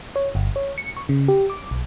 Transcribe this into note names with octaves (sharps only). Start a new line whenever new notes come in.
C#5
G1
C#5
C#7
C#6
C#3
G4
D6
B1